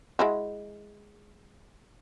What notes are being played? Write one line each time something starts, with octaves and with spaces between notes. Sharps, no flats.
G#3 E4 F#4